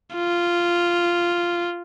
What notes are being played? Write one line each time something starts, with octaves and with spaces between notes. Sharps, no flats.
F4